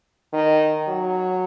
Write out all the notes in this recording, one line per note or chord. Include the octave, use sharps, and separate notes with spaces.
D#3
F#3